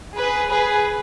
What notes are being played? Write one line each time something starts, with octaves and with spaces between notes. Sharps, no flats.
G#4 B4
G#4 B4